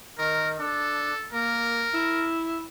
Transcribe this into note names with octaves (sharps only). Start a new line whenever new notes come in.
D#3 A#4
D4 A4
A#3 A#4
E4